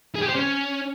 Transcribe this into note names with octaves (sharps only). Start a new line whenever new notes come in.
G#4
G4
C5
C#4